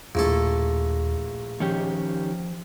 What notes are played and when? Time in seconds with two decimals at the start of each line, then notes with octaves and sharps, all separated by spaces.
0.15 A#1 D#2 A2 A4
1.60 D#3 F3 C#4 G4